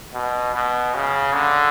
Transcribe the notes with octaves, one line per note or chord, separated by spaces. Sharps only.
B2
B2
C#3
D3